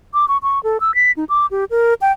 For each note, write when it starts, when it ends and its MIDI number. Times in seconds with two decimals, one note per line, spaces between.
0.14 0.25 86
0.28 0.38 85
0.43 0.62 85
0.63 0.78 69
0.81 0.94 88
0.95 1.12 95
1.17 1.25 63
1.29 1.46 86
1.51 1.65 67
1.71 1.94 70
2.01 2.12 79